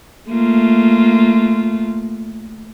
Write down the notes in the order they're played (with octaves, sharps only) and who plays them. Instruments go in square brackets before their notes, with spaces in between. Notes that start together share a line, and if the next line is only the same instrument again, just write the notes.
[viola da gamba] A3 A#3 F4